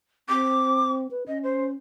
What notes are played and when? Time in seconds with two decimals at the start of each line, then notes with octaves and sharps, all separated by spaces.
0.29 C4 D6
1.11 B4
1.28 C#4 D#5
1.43 C5